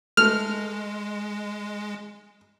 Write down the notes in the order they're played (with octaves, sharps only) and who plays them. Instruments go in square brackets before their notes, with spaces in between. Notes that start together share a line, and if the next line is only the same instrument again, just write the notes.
[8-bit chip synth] G#3 [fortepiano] A3 [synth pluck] F6